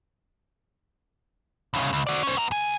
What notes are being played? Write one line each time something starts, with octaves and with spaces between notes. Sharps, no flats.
C2 C#3
C#2
F#4 D5
C#4 C5
B3 A#5
C#2 G#5